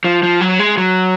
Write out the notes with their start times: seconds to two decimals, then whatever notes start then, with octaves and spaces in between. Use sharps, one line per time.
0.04 F3
0.23 F3
0.41 F#3
0.59 G#3
0.77 F#3